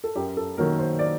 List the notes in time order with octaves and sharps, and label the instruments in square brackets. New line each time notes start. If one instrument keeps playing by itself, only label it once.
[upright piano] A4
F#2 G4
A4
D#3 F#3 A#3 A#4
C5
D5